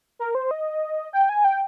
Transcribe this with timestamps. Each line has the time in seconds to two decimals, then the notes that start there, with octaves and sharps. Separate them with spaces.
0.19 A#4
0.35 C5
0.51 D#5
1.13 G5
1.29 G#5
1.44 G5